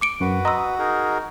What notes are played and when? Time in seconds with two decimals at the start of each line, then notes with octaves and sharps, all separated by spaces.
0.01 D6 C#7 D7
0.21 F#2 F#4 B4
0.45 D#5 A#5 C6 D#6 E6
0.79 D#4 G#4 A#4